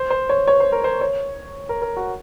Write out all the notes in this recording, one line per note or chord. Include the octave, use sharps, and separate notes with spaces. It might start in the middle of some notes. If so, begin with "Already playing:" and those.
Already playing: C5
C5
C#5
C#5
C5
A#4
C5
C#5
A#4
A#4
F#4